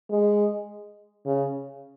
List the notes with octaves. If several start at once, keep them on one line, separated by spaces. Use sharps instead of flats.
G#3
C#3